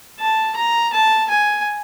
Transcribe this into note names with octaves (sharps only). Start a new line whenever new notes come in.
A5
A#5
A5
G#5